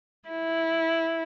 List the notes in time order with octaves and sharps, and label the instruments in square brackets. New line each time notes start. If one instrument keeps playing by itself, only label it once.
[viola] E4